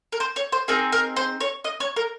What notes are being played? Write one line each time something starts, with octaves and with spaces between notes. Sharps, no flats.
A#4
C5
C#5
C5
C4 D#4 G#4 A#4
A#4
C5
C#5
D#5
C#5
A#4